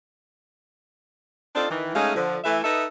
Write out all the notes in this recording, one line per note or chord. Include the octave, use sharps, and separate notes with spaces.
C4 D4 D#4 F4 A4 D5
D#3 E3
G#3 A3 C#4 D#4 G#4 F5
D3 F3
E3 A3 E5
D#4 A4 B4 D#5 E5